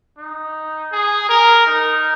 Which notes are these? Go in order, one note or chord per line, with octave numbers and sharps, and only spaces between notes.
D#4
G#4
A#4
D#4